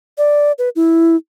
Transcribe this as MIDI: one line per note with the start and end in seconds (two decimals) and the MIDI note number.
0.18 0.52 74
0.58 0.69 71
0.76 1.16 64